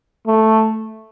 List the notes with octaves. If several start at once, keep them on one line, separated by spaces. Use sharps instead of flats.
A3